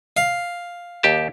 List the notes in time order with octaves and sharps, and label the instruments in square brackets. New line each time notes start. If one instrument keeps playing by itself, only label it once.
[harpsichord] F5
[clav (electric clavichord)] D#2 G4 A5